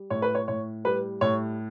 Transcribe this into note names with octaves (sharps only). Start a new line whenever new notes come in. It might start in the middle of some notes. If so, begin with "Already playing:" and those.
Already playing: G3
A2 C#5
B4
C#5
A2 C#5
G3 B4
A2 C#5